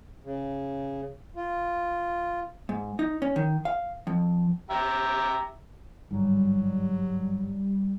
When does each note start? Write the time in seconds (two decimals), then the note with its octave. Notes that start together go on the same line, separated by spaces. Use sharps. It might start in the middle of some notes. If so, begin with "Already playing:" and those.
0.23 C#3
1.36 F4
2.69 G#2
2.99 D#4
3.22 C#4
3.36 D#3
3.65 F5
4.07 F2
4.71 G4 E5 A#5
6.11 G1 G#2 F#3 G3